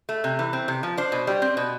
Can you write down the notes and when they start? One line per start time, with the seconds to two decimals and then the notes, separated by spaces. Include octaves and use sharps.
0.09 A3
0.24 C3
0.39 E3
0.53 C4
0.68 C3
0.83 F3
0.97 D4 C5
1.12 B2
1.27 G3
1.42 C4
1.57 B2